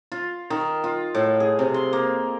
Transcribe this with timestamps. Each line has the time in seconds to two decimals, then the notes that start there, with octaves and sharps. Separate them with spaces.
0.12 F4
0.50 D#3
0.84 F4
1.15 A2
1.40 G#4
1.59 C3
1.74 C6
1.93 A#3